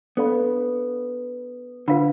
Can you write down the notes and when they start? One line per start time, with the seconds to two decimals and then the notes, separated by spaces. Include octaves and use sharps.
0.17 B3 D4 A4 D5 F5 B5
1.88 D3 F4 B4 F5 B5